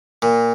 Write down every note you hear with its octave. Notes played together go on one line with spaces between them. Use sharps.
A#2